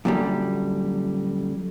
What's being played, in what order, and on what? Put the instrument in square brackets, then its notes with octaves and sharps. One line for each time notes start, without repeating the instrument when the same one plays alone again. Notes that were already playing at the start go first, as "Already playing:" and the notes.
[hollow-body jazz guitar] F#2 A#2 D3 G3